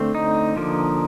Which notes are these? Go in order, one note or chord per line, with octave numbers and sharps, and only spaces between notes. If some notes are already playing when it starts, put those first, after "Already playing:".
Already playing: D3 A3 C4
D#4
D3 F3 A#3